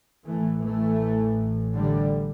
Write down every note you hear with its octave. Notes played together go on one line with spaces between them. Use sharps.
A1 A2 E3 A3
E3 A3
D3 G3